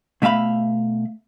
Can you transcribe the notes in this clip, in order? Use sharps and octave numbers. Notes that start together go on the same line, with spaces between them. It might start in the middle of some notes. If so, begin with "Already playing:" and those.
B2 A3 E5 F5 B5